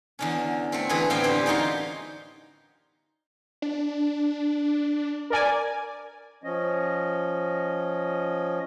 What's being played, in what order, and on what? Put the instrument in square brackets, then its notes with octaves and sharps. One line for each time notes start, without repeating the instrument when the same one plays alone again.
[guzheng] E2 D3 C#4
A3 C4
D3 E3 G#4 B4
A2 B3 C4 F5 G5 A#5
D3 E3 G3 B3 G4
F#2 D#4 F4 F#4 C6
[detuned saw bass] D4
[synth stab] A#4 D5 G#5
[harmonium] F3 C#4 D#5